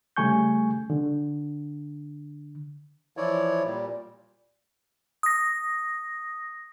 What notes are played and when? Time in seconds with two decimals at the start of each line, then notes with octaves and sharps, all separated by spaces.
0.17 C#3 G3 A3 G#5 C#6 G6
0.90 D3
3.17 E3 F3 E4 C#5 D5
3.65 A#2 G3
5.23 D#6 A#6